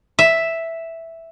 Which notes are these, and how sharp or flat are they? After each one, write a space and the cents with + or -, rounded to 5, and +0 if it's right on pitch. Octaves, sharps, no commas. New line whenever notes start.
E5 +0